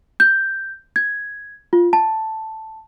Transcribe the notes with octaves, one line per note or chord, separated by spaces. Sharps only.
G6
G#6
F4
A5